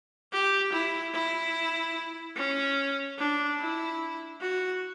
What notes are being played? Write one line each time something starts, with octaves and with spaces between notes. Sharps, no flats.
G4
E4
E4
C#4
D4
E4
F#4